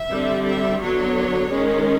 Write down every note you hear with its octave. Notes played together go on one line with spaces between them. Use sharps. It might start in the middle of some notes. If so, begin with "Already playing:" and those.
Already playing: E5
D3 G3 C4
E5
D3 F#3 B3 C#5
D#3 G#3 C#4